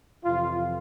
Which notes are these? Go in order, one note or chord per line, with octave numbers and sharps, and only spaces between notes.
F2 C3 E3 F4